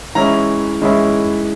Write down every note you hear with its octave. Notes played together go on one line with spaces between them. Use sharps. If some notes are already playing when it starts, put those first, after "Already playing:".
E3 G#3 C#4 E4 A#5
E3 G#3 C#4 E4